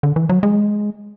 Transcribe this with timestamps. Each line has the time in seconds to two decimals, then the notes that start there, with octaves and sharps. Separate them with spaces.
0.03 D3
0.16 E3
0.29 F#3
0.43 G#3